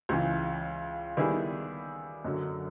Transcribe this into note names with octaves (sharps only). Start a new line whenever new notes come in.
C#2 C#3 E3
D#3 G3 B3 E4 G#4
F#2 D3 F#3